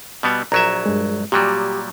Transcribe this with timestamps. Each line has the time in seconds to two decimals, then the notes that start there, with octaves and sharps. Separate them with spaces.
0.23 B2 G3 B3
0.52 A#1 F#3 E5 A#5
0.86 G2 G#3
1.32 A#2 F#3 G3 G4